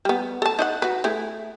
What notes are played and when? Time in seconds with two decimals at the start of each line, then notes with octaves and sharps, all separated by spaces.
0.05 G3 B3
0.42 A4 A5
0.59 D#4 D#5 F#5
0.82 F#4 B4
1.04 A3 E4 G#4